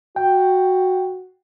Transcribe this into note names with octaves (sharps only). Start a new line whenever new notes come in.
F#4 G5